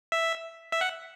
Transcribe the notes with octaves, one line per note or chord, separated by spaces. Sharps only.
E5
E5
F#5